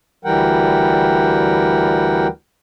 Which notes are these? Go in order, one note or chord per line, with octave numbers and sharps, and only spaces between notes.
D2 E3 G3 A#4 F#5 G5